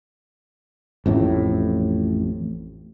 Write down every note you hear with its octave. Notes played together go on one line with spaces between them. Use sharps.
A1 F2 A2